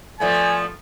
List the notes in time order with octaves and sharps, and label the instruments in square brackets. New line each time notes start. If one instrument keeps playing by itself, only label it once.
[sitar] F3 A3 B3 [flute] D5 [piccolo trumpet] G#5